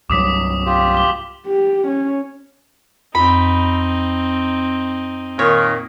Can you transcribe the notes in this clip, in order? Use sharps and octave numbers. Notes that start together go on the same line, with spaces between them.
C2 G2 F#3 D6 D#6 B6
F4 G4
D6 G7
G4
C#4
F2 C4 D#4 B5
A#2 D#3 C#5